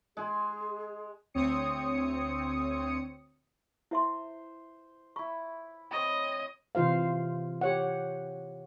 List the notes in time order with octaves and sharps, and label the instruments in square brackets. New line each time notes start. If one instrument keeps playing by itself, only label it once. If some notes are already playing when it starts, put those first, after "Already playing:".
[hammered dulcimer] G#3 G#5 [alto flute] G#4
[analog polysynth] D2 C4 C#5 D#6 C#7
[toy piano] E4 E5 C6 [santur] C5
[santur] E4 B5 [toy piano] C#6
[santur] C4 C#5 B5 [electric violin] D#5 [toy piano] G5
[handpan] C3 E3 F4 C5 F5
G4 C#5 F#5